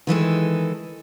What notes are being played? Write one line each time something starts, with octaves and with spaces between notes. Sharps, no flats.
D#3 E3 G#3 A4